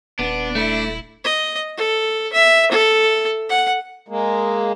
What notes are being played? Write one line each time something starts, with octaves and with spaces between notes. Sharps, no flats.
D#1 B3 D4
A3 E4
D#5
A4
E5
A4
F#5
G#3 A#3